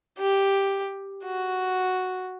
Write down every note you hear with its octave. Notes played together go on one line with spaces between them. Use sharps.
G4
F#4